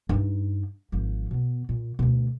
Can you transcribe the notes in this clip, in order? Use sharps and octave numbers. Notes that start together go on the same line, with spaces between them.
G2 D#4
G#1 F3
B2 B3
A#2
D2 B2